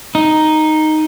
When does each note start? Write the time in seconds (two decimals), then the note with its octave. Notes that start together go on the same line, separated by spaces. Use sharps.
0.15 D#4